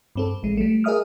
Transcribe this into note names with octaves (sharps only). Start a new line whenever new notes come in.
G2 C4 A4
A1 G#3
G3 A3
G#4 A#4 D#5 E5 D#6 F6